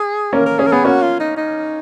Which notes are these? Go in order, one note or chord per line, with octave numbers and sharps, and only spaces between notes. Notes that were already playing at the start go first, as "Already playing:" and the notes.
Already playing: G#4
A#3 C#4 A#4
A#4
C#4 G#4
A#4
B3 G#4
A#3 C#4 F#4
F4
D#4
D#4